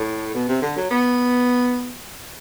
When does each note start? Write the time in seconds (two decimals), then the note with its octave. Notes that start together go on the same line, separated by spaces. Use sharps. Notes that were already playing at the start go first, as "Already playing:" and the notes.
Already playing: A2
0.34 B2
0.48 C3
0.62 D3
0.77 F#3
0.91 B3